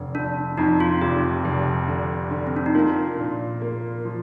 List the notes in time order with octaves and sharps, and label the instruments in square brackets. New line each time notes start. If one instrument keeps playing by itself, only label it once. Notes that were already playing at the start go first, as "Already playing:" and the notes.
Already playing: [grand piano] F1 D3
[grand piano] F1 [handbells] D4
[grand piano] F2 [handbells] D#4
[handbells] F4
[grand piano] F1 [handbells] G4
[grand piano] F1
D3
D3
[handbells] C4
D4
D#4
[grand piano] A#3 [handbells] F4
[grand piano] A#2
A#3
F3